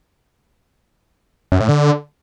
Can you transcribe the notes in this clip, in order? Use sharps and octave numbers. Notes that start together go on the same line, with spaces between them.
F#2
A2
D3